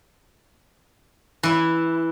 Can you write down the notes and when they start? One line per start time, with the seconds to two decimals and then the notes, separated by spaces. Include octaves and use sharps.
1.43 E3 E4